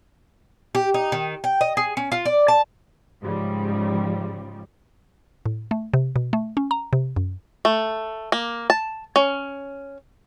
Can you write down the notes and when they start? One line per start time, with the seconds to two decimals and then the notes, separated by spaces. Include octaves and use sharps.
0.75 G4
0.94 D#4
1.12 D#3
1.44 G5
1.61 D#5
1.77 G#4
1.97 C#4
2.12 F4
2.25 D5
2.48 A5
3.22 G#2 C#3 F3 G3
5.46 A2
5.71 A3
5.94 C3
6.16 B2
6.33 A3
6.57 C#4
6.71 A#5
6.93 C3
7.16 F#2
7.65 A3
8.32 A#3
8.70 A5
9.16 C#4